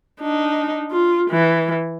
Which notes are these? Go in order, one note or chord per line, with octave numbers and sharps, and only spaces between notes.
D4 D#4
F4
E3